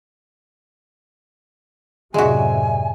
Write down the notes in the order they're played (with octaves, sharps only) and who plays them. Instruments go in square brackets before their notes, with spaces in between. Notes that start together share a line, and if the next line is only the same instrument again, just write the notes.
[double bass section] F#2 A2 C3 [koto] G#3 F#4 [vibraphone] D5 E5 [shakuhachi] G#5